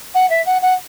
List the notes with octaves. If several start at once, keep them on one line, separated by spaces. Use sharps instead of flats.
F#5
E5
F#5
F#5